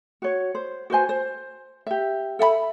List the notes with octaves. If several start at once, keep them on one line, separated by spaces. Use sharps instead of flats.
F#4 C#5
C5
F#4 B4 C5 G#5
C5
G4 E5
A4 E5 F#5 B5